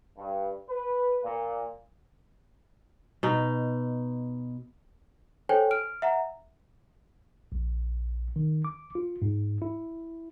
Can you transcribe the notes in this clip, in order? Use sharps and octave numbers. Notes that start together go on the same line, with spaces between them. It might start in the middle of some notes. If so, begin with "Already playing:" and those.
G2
B4
A#2
B2 D#4
A4 C5 C#5 G5 G#5
F6 D7
E5 F#5 A#5
A#1
D#3
D6
F4
G#2
E4